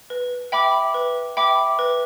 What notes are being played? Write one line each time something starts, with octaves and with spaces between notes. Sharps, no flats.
B4
E5 G5 B5 D6
B4
E5 G5 B5 D6
B4